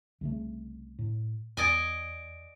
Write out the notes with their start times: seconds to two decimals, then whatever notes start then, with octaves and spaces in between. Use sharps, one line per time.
0.21 C2 C#3 A3
0.99 A2
1.57 E2 D5 D#5 G#5